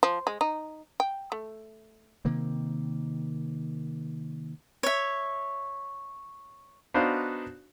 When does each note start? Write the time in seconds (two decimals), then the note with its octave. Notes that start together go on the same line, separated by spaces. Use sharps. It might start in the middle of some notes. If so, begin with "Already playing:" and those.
0.03 F3
0.27 G#3
0.41 D#4
1.00 G5
1.32 A3
2.25 C3 D#3 A#3 C4
4.83 C#5 E5
6.94 B3 D4 D#4 F#4 C5 F5